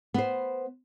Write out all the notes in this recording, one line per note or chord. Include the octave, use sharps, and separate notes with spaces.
B3 C5